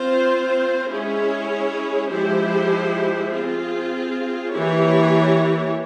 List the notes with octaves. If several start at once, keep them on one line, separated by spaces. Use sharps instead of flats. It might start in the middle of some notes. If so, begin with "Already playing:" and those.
Already playing: C4 F4 C5
G#3 C#4 E4 G#4 C#5
F3 G#3 E4 G4 C5
C4 F4 G#4
E3 A#3 E4 G4 C#5